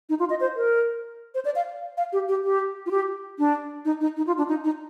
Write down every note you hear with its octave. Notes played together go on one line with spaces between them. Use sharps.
D#4
F4
D#5
C5
A#4
C5
D5
F5
F5
G4
G4
G4
F4
G4
D4
D#4
D#4
D#4
F4
D4
D#4
D#4